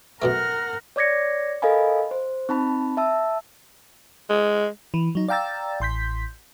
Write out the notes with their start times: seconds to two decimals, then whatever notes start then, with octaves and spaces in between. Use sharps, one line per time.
0.22 F#2 B2 A3 A#4 F#5 F6
0.96 C#5 D5 D6 G#6 A#6 C#7
1.62 A4 A#4 D#5 F5 G#5 B5
2.11 C5
2.49 C4 D#4 A5 B5
2.97 E5 A5 E6
4.30 G#3
4.94 E3
5.15 F#3 D#4
5.28 D5 F5 G5 A#5 E6 A6
5.80 A1 C6 G6 B6